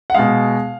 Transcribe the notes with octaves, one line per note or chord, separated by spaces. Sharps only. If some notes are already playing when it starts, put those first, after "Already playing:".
F#5
B2 G#3 F5